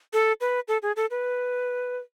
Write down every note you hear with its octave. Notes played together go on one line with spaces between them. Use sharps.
A4
B4
A4
G#4
A4
B4